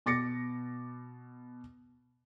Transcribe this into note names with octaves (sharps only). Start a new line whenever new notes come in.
B2 D6 A6 A#6 C#7